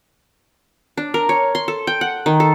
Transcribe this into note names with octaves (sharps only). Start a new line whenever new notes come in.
D4
A#4
C#5
C6
A4
G5
F#5
D#3
A4